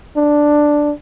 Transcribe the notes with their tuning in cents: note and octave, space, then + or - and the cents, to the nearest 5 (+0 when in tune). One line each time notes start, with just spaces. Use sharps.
D4 +5